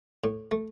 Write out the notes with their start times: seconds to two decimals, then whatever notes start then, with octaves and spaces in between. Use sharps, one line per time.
0.24 A2
0.51 A3